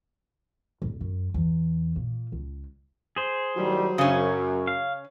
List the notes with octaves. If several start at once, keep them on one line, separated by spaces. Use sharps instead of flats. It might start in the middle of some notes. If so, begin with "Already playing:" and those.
D1
F#2
E2
A#2
C#2
G#4 C5
A2 D#3 F#3 G3
F#2 C#3 C#4
F5